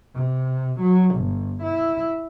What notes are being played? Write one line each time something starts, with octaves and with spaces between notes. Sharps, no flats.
C3
F#3
G1
E4